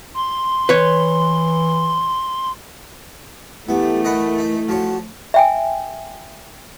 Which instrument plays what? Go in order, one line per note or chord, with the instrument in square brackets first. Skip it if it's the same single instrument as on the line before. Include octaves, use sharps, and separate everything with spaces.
[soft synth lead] C6
[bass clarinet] E3 [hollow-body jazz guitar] B4 C#5
[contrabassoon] E3 [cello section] A3 [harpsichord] B3 [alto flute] G4
[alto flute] A#4 [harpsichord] D#5 F#5 B5
[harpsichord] D#4
[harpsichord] F3 C#5 [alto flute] F#4
[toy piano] E5 G5 G#5